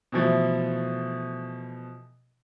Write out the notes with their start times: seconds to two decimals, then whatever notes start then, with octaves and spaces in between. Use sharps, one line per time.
0.12 B2 E3 F3 A3